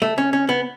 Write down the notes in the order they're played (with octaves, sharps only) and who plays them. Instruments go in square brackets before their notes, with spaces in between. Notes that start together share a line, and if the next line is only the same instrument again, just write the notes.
[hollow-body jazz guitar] A3
C#4
C#4
B3